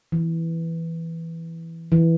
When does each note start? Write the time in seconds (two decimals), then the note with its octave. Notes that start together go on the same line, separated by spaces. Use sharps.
0.12 E3
1.92 E3